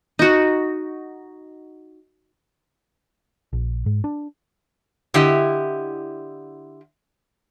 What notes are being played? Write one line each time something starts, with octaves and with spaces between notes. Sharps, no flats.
D#4 F#4
A#1
G#2
D4
D3 E4 G4 D#5